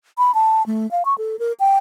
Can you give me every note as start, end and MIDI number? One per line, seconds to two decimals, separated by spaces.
0.18 0.34 83
0.34 0.65 81
0.66 0.89 57
0.91 1.03 77
1.05 1.16 85
1.18 1.39 69
1.39 1.52 70
1.60 1.78 79